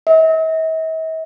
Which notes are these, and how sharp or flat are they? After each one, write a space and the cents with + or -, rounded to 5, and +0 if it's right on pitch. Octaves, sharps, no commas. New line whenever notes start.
E5 -45